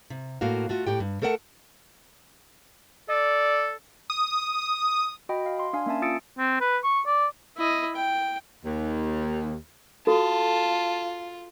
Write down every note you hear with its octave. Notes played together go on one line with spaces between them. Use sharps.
C3
A2 A#3 F#4 F5
A3 F4 F#4
A2 G4 G5
G2
A3 A4 A#4 C#5 F#5 A5
A4 D5
D#6
F#4 D#5 G5 B5
F5
C6
D4 F5 G#5
A#3 C#4 E5 G#5 A5
F4 D#6 E6 A6 C#7 D7
C4
B4
C#6
D5
E4 D#5
G5
D#2
F4 F#4 A4 A5